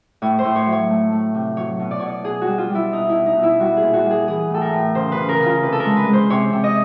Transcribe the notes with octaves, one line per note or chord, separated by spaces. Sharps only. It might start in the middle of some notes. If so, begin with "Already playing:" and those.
A2 C#5
C5
A2
C#5
F#3
C#5
A3
A3
C3
F#3 C#5
B2
D5
B2 C#5
D5
B2 G#4
F#4
G3
F4
G3
E4
B2 D#4
E4
B2
D#4
B2
E4
G3 F#4
G#4
A#2
F#4
G3
G#4
E3 G#4
A2 A4
A#4
A2
C#3 C5
B4
C#3
A#4
C#3
F4
C3 B4
A4
A#4
G#3
B4
G#3
C5
C3 C#5
C3
D#5